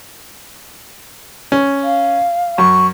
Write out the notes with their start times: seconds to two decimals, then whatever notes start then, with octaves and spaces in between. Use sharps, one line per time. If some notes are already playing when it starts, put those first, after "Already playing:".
1.52 C#4
1.84 F5
2.58 F#2 C#6